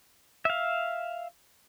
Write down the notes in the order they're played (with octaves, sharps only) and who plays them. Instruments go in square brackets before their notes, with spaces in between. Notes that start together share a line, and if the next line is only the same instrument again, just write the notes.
[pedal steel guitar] E5 F5